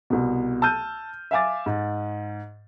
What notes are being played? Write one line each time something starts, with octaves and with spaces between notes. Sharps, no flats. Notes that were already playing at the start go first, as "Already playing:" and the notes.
C2 B2
A5 E6 F6 G6 D#7
E5 F5 G#5 D6 A6
G#2